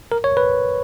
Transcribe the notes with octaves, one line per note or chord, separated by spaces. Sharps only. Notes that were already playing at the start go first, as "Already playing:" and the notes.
A#4
C#5
B4